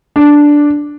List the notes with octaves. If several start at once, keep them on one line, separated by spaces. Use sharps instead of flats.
D4